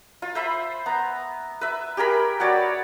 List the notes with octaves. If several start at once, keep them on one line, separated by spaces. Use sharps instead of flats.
F4
C5 E5 B5
B3 A#5
B4 E5
G4 G#4 A#4 B5
B3 F#4 C#5 D5